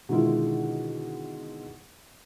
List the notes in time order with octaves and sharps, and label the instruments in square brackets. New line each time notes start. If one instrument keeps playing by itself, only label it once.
[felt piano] B2 D3 D#3 G#3 E4 F4